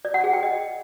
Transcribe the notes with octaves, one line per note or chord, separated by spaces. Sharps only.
D5
F#5
G#4
G5
D#5